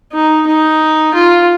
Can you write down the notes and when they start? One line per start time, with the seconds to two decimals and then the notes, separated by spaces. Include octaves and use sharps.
0.13 D#4
0.47 D#4
1.14 F4